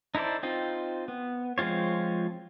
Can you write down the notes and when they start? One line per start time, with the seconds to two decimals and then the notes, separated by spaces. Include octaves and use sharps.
0.15 D#4 E4 A4 C5 D5
0.43 C4 D#4 F4
1.08 B3
1.58 F3 G#3 C4 F4 C#5